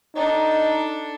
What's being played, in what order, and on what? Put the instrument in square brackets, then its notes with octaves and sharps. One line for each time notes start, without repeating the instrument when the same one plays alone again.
[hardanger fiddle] D4 A4 [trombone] D#4